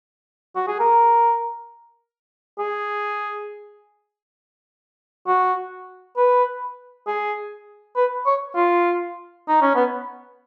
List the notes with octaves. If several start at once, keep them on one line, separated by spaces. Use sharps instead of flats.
F#4
G#4
A#4
G#4
F#4
B4
G#4
B4
C#5
F4
D#4
C#4
B3